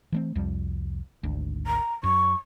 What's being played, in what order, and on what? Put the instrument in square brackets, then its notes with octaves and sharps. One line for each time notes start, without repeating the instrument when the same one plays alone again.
[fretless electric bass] E3 A3 C4
C2 F2 G3
G#1 D2
[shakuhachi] A#5
[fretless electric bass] F#2 [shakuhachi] C#6